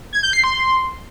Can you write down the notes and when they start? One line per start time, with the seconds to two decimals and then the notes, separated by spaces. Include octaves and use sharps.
0.13 G#6
0.23 G6
0.33 C7
0.44 C6